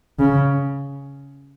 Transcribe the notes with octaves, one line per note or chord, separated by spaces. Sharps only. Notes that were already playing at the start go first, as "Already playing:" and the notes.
C#3